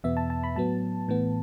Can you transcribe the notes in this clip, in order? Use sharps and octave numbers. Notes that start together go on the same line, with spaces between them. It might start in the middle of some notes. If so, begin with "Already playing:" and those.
E2 B2 B3 E5
A5
A5
B5
A2 F#3 B3 A5
A2 E3 B3